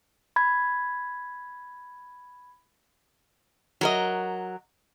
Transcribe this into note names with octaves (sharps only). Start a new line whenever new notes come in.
B5 G#6
F#3 A#4 D#5